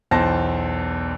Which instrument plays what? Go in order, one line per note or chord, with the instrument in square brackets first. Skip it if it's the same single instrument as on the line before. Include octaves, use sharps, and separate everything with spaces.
[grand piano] B1 E2 C5 A5 A#6